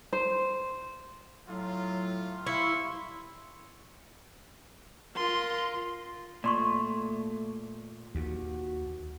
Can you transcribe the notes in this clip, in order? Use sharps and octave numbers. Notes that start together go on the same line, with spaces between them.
C5
A2 F#3 F4
G3 E4 F5 C6 C#6
F4 A#4 C6
A#2 A3 D5 C6 C#6
D#2 F#4